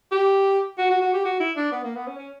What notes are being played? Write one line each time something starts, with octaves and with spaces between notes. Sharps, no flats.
G4
F#4
F#4
F#4
G4
F#4
E4
D4
B3
A#3
B3
C#4
C#4